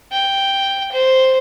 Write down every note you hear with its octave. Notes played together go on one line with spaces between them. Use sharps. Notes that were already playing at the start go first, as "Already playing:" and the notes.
G5
C5